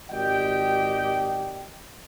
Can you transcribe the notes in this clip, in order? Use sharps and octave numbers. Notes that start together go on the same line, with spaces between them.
G#1 G4 D5 D#5 G5